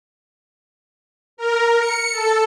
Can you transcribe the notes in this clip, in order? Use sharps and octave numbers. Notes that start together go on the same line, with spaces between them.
A#4
C#7
A4